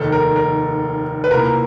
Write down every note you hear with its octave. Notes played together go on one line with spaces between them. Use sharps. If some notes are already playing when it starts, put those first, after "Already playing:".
Already playing: F1 D#2 D#3 A4
A#4
A#4
B4
C2 A#2 A#4